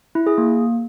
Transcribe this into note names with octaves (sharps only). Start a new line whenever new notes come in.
E4
G#4
A#3